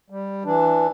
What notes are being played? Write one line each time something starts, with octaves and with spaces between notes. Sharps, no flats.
G3
E3 D4